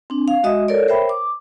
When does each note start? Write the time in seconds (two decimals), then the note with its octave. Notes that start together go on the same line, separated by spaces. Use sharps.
0.10 C4 D4
0.28 F5
0.43 G#3 F#4 D#5 E5 D#6
0.68 A4 A#4 C#5 D5
0.88 A#4 C5 C#5 E5 G5 B5
1.09 D6